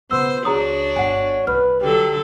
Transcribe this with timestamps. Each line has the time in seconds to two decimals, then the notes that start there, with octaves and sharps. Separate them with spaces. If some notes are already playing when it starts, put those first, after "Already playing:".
0.11 C#3 B3 F4 C5 E6
0.45 C#2 D4 F#4 G#4 C#5 A#5 D#6
0.96 G1 F#5 G#5
1.47 C2 B4 F6
1.81 D3 F#3 G4 A4